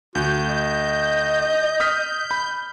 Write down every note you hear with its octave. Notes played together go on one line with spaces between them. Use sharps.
D2 F#4 G6
D#5
D#6 F6 B6
B5